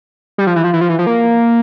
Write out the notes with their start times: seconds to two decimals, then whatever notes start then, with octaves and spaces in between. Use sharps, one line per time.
0.38 G3
0.47 F3
0.56 E3
0.64 F3
0.73 E3
0.81 F3
0.89 E3
0.99 F3
1.07 A#3